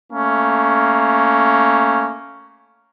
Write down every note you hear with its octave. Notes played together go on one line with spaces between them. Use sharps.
A3 A#3 C#4